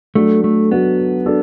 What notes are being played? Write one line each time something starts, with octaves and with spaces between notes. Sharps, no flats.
F#3 A3 D4 F#4 A4
A3
F#3 B3 D4 F#4 A4
D4 F#4 A4